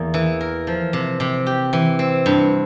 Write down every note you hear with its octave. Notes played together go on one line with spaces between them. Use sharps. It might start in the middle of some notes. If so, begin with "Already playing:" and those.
Already playing: E2 A#3
E3
A#4
F3
C3
C3
G4
E3
C4
G2